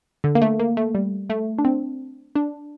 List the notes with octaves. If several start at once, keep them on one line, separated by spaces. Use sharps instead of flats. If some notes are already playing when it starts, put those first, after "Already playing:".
D3
A#3
A3
A#3
A3
G3
A3
D4
C4
D4